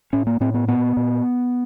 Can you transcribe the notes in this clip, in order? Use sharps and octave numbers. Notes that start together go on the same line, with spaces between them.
A2 C#4
A#3
A2 C4
B3
A#2 B3
A#2